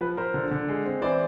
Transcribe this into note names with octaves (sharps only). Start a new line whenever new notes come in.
F3 B4
F3 A#4 C5
D3
D3
G#3
C4
E3 C5 D5